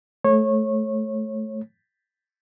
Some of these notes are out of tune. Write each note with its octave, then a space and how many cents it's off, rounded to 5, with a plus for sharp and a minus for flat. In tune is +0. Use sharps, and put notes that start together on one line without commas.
A3 -15 C#5 -25